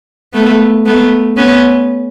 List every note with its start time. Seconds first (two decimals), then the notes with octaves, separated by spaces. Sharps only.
0.33 A3 B3
0.86 A3 B3
1.37 B3 C#4